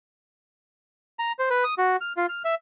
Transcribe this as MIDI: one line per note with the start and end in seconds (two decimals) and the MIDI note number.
1.19 1.32 82
1.39 1.49 72
1.50 1.64 71
1.64 1.74 87
1.78 1.96 66
2.01 2.13 89
2.17 2.26 65
2.29 2.42 89
2.45 2.55 76